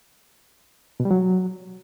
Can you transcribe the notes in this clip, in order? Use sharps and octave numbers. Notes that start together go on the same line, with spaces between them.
B2
G3
F#3